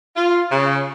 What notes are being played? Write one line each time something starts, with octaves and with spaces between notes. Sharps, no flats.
F4
C#3